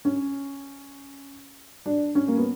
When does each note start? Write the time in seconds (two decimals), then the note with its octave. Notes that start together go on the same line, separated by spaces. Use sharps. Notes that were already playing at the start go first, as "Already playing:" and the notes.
0.05 C#4
1.86 D4
2.15 C#4
2.28 A#3
2.37 B3